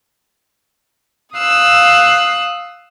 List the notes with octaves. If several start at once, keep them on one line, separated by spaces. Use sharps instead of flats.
F5 D#6 E6 F#6